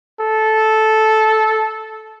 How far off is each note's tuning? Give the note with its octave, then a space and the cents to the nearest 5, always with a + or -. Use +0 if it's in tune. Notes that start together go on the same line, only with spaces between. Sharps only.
A4 -10